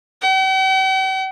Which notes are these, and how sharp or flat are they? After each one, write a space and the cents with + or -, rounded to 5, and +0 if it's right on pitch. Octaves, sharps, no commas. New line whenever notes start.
G5 -45